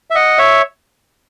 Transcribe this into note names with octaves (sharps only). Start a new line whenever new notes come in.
E5
D#5 F#5
C#5 E5